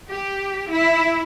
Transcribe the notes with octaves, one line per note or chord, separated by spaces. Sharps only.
G4
E4